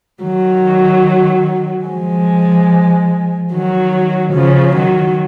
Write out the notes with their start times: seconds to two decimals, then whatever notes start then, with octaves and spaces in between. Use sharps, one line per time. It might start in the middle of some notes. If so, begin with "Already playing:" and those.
0.23 D#3 F#3
1.87 F3 G#3
3.51 D#3 F#3
4.33 C#3 F3
4.75 D#3 F#3